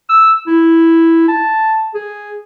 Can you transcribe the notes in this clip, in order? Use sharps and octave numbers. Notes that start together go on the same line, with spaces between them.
E6
E4
A5
G#4